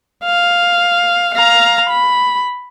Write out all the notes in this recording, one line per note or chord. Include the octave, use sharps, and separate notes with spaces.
F5
F5 A#5
B5